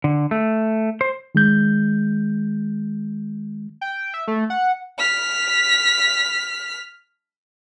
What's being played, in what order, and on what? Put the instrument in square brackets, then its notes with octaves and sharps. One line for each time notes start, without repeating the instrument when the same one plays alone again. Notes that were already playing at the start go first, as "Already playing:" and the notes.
[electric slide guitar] D3
A3
C5
[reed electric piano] D#3 G#3 G6
[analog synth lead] G5
E5
A3
F#5
[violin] F6 B6